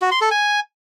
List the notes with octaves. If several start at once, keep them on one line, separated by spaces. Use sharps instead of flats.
F#4
C6
A4
G#5